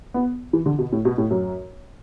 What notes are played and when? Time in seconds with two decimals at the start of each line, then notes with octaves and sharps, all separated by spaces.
0.14 B3
0.53 E3
0.66 D3
0.79 B2
0.92 A2
1.05 B2
1.18 A2
1.31 F#2